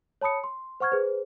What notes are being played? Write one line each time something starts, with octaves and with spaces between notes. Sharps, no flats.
C#5 A5 B5 D#6 C#7
C6
C5 F#5 C#6 F6 G#6
G#4 B4 C5